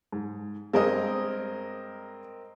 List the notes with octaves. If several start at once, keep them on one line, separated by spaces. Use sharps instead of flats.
G#2
G2 G#3 C4 A#4 D#5